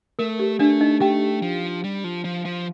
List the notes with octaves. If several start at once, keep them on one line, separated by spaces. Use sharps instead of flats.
A3 A#4
G4
A3 D4 D5
D#4 D#5
A3 G4 G5
F3
G3
F3
F3
F3